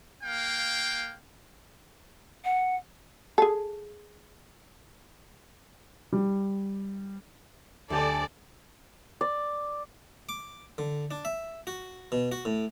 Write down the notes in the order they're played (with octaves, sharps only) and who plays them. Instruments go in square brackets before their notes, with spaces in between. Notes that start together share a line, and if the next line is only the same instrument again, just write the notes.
[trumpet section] A#3 F5 G5
[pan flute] F#5
[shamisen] G#4 A4
[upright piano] G3
[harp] D2 G4 G#5 [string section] A4 D5
[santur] D5
[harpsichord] D6
D3
D4
E5
F#4
B2
F#4
A2